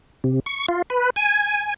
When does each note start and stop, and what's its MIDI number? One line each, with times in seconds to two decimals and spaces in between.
0.24 0.40 48
0.46 0.66 85
0.69 0.82 65
0.90 1.10 71
1.16 1.74 80